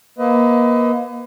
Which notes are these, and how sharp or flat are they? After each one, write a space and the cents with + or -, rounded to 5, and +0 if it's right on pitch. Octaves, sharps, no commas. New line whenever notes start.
A#3 +35 B4 +30 D#5 +25